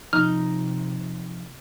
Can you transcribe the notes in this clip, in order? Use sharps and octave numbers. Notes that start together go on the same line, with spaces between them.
C3 F3 D#4 F6